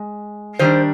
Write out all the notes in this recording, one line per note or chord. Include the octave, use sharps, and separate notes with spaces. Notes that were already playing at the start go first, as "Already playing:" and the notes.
Already playing: G#3
D#3 G3 D4 C5